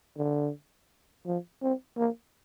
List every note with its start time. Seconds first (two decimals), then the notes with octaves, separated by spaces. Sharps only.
0.17 D3
1.26 F3
1.62 C4
1.97 A#3